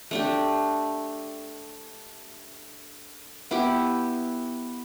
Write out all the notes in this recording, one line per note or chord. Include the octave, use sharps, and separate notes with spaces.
A3 D4 G4
B3 E4 G4